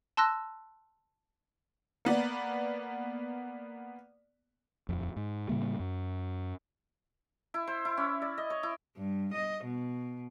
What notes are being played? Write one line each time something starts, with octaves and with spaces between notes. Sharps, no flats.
A5 C6 E6 F#6 A#6
A#3 B3 D5
D#1 F2
G#2
A2 C#3 G3 A#3
F#2
E4
C5
E4
C#4
D5
D#5
C#5
E4
G2
D#5
B2